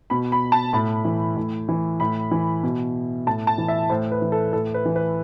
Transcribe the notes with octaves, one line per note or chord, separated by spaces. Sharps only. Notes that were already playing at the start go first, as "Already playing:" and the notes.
B2 B5
B5
A5
A2 B5
E3
A2
E3
A2 B5
E3
B2
A2 A5
A5
E3
E5
A2 C5
B4
E3
A4
A2 A4
B4
E3
B4